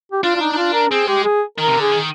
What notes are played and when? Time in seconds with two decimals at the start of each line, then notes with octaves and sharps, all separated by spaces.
0.12 G4
0.23 D4 F4
0.36 F4
0.41 D#4
0.52 D#4
0.57 F4
0.73 A#4
0.91 C4 G#4
1.07 G#3 G4
1.24 G#4
1.58 D#3 A#4
1.67 C3
1.75 D3
1.81 G#4
1.91 D#3